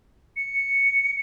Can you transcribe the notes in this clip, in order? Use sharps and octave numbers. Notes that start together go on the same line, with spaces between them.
C#7